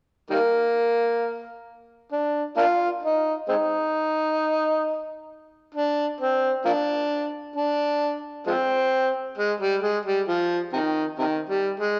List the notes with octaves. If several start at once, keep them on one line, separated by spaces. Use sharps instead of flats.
D#3 G3 A#3
D4
A#3 D4 F4
D#4
G#3 C4 D#4
D4
C4
F3 A#3 D4
D4
F3 G#3 C4
G#3
G3
G#3
G3
F3
C3 D#3
C3 D#3
G3
G#3